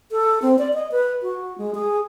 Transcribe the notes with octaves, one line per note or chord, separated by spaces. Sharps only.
A4
C4
D5
D#5
B4
F#4
G#3
G#4